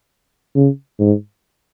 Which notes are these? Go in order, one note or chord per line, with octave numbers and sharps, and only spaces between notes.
C#3
G#2